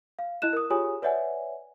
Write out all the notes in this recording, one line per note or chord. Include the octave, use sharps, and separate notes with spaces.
F5
E4 D#5 F#6 E7
A#4 D#6
F4 G4 G#4 C#5 G#5 D#6
B4 C#5 D5 E5 F#5 G#5